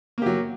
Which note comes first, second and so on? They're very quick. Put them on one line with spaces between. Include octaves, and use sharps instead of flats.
A#3 G4 F#3